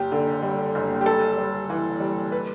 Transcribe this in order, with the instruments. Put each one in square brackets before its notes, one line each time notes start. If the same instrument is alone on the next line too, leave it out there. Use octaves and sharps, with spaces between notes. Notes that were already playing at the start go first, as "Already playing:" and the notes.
Already playing: [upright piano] F#1 G4
D3
G3
F#1
G4
G3 A4
G3
E3
G3
B4